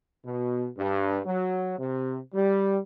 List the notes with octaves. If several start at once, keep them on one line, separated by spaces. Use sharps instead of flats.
B2
G2
F#3
C3
G3